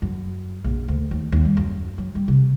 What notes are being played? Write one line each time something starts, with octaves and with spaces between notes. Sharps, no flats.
F#2
A#1
D2
D#2
D#2
G3
F#2
F#3
G3
C3